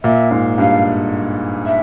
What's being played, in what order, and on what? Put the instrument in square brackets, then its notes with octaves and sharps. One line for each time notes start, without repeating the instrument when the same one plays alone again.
[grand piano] A#2 [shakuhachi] E5
[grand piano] G#2 [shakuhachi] F5
[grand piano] G2 [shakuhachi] F5
[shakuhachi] E5